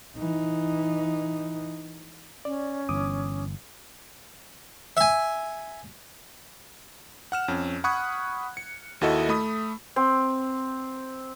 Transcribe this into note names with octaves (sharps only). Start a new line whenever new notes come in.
E3 D#4
C#4 D5
G1 E3 D6 D#6
E5 G#5
F#5 F6 E7
F2 C#4
F#5 B5 C#6 D#6 F#6 G#6
C#7
D#2 E4 F#4 A4 D#5 E5
A3 B5 D#6
C4